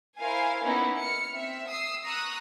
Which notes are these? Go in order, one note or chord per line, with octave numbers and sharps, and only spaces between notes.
E4 A#4 C5 F5 G#5
A#3 B3 C#4 D#4 E4
F6 C#7
C4 E5
D#6 E6 C7
A#5 C#6 D#6 E6 F#6